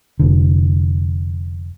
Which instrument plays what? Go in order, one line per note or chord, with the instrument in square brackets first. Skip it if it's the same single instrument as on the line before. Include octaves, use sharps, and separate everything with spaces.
[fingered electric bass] F1 D3